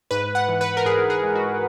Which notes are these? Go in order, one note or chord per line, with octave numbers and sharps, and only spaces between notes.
G#2 B4
F#5
E3
B4
A#4
G#2 G#4
G#4
G#3
F#4